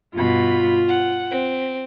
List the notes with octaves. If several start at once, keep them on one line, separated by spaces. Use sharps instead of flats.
G2 B2 F4 B5
F#5
C4